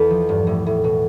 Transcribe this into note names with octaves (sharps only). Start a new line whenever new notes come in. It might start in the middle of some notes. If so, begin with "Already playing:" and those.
Already playing: E2 A4 B4
F3
G2
A2
A2
B2